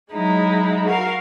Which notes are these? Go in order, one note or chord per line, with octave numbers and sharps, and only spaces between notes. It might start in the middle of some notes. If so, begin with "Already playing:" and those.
F#3 G#3 D#4 E4
F#4 A#4 F5